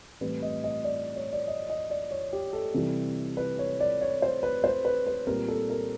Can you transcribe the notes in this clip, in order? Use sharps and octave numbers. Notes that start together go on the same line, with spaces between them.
A2 E3 G3 C4 B4
D#5
D#5
D5
C#5
D5
D#5
D#5
D5
C#5
G4
A4
C3 E3 G3
B4
C#5
D5
C#5
C5
B4
C5
B4
B4
A#2 G3 C4 A#4
A4
A#4